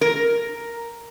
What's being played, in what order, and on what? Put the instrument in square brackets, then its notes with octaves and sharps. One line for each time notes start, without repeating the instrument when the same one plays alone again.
[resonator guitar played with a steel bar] A#4